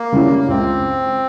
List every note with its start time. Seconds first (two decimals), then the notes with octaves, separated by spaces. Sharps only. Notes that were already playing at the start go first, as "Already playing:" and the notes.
Already playing: A#3
0.12 C#3 G3 C#4 E4
0.39 A#3
0.48 C#2 C4